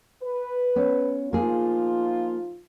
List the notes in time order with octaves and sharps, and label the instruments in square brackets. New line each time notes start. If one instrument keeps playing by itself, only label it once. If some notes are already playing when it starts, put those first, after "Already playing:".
[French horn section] B4
[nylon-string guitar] B3 C#4
[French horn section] F3 D#4 F4 [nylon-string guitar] A#3 G#4